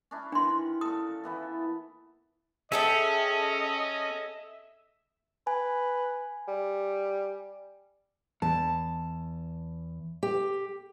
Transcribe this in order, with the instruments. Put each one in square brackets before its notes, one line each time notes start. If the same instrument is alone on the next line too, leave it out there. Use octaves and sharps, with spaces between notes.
[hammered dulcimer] C#4 D4 E4
[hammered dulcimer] D#3 E3 F#5 [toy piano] D4 C6
[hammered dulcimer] A#2 A4 [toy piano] D#6
[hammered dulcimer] E3 B3 E4
[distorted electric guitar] C#4 [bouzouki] G#4 A4 G5 [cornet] D#5 [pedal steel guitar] E5
[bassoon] B4 [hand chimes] G#5
[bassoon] G3
[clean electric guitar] E2 [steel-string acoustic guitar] A5
[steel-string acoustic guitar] G4